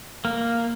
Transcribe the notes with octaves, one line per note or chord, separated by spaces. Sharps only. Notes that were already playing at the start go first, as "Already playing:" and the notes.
A#3